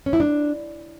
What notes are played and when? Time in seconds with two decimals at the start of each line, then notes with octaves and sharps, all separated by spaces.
0.06 C#4
0.13 E4
0.20 D4